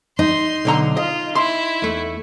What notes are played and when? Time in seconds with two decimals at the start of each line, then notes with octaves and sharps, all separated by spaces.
0.19 D#4 C6
0.65 B1 D3 A#5
0.97 F4 D#5
1.35 E4 C6
1.82 E2 A3